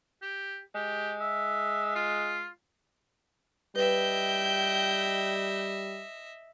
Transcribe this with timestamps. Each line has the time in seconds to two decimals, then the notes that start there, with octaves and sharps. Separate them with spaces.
0.22 G4
0.75 G#3 G4
1.20 E5
1.95 F4
3.76 G3 B4 D#5 E5 G5 G6